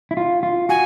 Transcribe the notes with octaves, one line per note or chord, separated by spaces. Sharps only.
E4
F4
F4
F#4 G#5